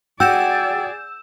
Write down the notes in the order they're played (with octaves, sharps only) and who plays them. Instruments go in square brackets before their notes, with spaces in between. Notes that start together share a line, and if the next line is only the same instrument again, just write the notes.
[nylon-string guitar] F#4 [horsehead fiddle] G#4 D5 [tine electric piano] G5 [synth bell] E6 G6 E7